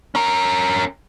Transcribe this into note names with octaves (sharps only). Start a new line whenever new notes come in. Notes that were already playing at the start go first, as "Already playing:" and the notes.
C#4 A#4